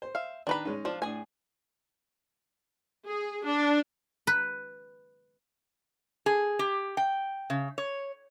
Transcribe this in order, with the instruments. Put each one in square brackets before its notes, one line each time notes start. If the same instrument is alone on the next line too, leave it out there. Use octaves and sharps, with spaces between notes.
[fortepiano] C5
[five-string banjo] E5 F5
[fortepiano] D#3 D5 A#5 [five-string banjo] D4 B4 B5
[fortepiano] G#3 C#4 D#4
[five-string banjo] F3 D4 [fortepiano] F4
[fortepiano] A2 D4 [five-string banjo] G#4 G#5
[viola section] G#4
D4
[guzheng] B4
[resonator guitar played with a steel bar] G#4
G4
G5
C#3
C#5